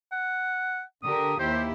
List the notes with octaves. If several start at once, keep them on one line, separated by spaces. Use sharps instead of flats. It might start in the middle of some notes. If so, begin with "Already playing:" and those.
F#5
D3 G4 A#4 D#6
D#2 E4 G4 C5